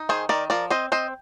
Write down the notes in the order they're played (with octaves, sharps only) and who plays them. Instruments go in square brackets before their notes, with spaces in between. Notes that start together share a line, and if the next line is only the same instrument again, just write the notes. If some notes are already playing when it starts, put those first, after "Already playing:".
Already playing: [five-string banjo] D#4
D#3 G#4 C5
D#3 A#4 D5
F3 A#4 D5
C4 C5 D#5
C4 C5 D#5